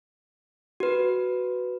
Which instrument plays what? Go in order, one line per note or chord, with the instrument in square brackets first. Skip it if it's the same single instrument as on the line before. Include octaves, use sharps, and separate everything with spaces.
[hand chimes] F#4 B4